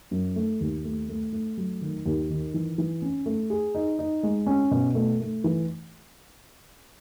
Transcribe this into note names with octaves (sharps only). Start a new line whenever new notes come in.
F#2
A3
D#2
A3
A3
A3
F#3
D#3
D#2
D#3
E3
E3
C#4
A3
G#4
D#4
D#4
G#3
C#4
B2
A3
A3
E3